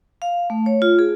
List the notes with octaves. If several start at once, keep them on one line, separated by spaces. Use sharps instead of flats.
F5
A3
C#5
F4
G#4